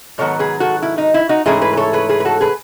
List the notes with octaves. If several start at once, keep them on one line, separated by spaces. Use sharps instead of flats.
G#2 D#3 F#3 B3 A4 C#5
G#4 B4
F#4 A4
E4
D#4
E4
D#4 F#4
G#2 E3 A3 C#4 E4 G#4
G#4 B4
B4
A4 C#5
G#4 B4
G#4 B4
B4
F#4 A4
G#4 B4